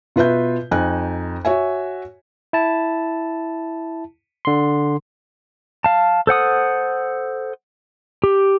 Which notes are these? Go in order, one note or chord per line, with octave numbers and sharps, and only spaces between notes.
B2 F4 B4 E5 G6
F2 D#4 G#5 F#6
F#4 C#5 E5 G#5
E4 A5
D3 C6
F5 A5
A4 C5 F#5 D#6
G4